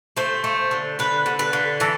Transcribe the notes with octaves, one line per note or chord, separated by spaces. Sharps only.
A3 C5
A3
D3
D3 B4
D3
B4
D3
E3 A4